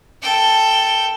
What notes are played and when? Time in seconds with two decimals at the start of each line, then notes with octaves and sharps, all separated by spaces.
0.22 A4 G5